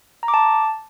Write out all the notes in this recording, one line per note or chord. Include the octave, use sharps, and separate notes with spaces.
A#5
D6
A5